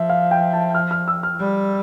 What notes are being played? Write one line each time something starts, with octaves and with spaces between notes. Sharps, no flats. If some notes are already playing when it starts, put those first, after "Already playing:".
Already playing: F3 E5
F5
G5
A5
F6
F6
E6
F6
G3